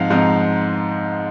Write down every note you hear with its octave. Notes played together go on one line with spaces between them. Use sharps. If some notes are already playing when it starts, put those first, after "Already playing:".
Already playing: G#2 F3 C4 D#4 F5 F#5
G#2 F3 C4 D#4 D#5